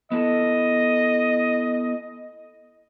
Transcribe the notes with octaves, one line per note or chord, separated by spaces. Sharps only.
B3 E4 A4 D#5